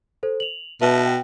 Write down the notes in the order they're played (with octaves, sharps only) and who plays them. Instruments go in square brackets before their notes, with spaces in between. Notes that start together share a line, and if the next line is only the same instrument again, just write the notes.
[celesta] A4 C5
F7 F#7
[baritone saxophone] B2 [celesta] B4 E5 A5
[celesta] G5